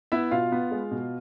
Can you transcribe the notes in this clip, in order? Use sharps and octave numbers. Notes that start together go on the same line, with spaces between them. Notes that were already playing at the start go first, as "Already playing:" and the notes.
B3 E4 E5
B2 F4 F5
B3
G#3
B2